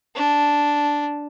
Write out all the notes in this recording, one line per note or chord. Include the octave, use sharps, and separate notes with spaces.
D4